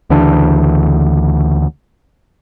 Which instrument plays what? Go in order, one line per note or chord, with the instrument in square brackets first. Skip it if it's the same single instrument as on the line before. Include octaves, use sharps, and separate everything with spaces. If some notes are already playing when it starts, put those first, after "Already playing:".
[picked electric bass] D2 C#3 E3 D4